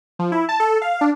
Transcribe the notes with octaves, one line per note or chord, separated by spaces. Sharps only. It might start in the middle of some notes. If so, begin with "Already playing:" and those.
F3
E4
A5
A4
F5
D4